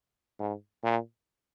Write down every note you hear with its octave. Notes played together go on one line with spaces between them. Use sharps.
G#2
A#2